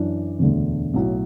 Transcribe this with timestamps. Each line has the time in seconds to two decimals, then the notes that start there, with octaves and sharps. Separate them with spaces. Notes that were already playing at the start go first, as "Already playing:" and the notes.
Already playing: F#2 E3 D4
0.39 E1 D2 D3 A3
0.94 B1 A2 F#3